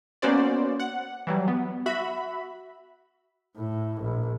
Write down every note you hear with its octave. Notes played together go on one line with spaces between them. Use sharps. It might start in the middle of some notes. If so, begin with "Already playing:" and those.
A#3 B3 C#4 F#4 C5 D5
F#5
E3 F#3 G3
B3
F#4 E5 B5
A2
A#1